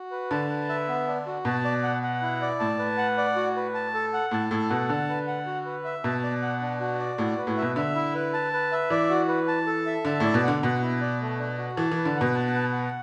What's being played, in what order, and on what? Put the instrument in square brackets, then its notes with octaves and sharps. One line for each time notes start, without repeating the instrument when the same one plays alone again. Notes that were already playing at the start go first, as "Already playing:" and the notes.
Already playing: [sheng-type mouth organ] F#4
B4
[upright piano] D3 [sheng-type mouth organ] A5
[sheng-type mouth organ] B4
E5
B3
D4
F#4
[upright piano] B2 [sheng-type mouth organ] A5
[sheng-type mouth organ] D5
F#5
F#5
E4
D5
[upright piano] A2 [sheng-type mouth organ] A5
[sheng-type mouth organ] B4
F#5
D5
F#4
B4
A5
A4
F#5
[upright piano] A2 [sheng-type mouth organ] A5
[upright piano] A2 [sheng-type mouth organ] A4
[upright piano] B2 [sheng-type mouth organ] F#5
[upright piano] D3 [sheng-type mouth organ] A5
[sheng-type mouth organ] B4
F#5
F#4
B4
E5
[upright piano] B2 [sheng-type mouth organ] A5
[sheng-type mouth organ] D5
F#5
D4
F#4
D5
[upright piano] A2 [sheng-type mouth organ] F#4
[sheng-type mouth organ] B4
[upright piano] A2
[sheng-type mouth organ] E5
[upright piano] B2
[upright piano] D3 [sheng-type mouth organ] E5
[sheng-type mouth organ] E4
B4
A5
B4
E5
[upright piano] E3 [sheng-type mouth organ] D5
[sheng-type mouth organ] F#4
B4
A5
A4
E5
[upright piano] D3 [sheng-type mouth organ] A5
[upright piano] A2 [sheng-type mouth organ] D5
[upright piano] B2
[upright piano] D3 [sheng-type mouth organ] F#5
[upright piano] B2 [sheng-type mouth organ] F#5
[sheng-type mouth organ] E4
D5
A3
D4
F#4
[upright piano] E3 [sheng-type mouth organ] A5
[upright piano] E3
[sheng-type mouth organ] B4
[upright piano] D3
[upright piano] B2 [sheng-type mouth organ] F#5
[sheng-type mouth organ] A5
B4
F#5